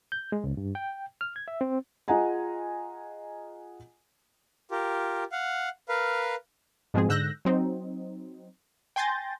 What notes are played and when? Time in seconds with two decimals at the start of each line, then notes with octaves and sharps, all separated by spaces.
0.12 G6
0.32 G#3
0.44 C#2
0.57 G2
0.75 G5
1.21 F6
1.36 G#6
1.48 E5
1.61 C4
2.08 F4 G#4 D#5 F#5 G#5 A#5
4.71 F4 G4 A#4
5.32 F5 F#5
5.89 A#4 B4 F5
6.94 G#2 B2 F3 G#3 C4 G#4
7.09 G#2 D3 E6 F#6 G6 A#6
7.45 F#3 C4 D#4
8.96 G5 G#5 C6 G6 A6 A#6